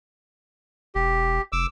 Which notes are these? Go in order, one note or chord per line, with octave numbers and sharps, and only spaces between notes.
E1 G4
F1 D6 E6